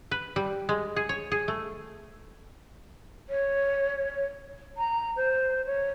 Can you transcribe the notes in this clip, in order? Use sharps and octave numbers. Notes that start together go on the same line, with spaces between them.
B4
G3
G#3
G#4
C#5
G#4
A3
C#5
A#5
C5
C#5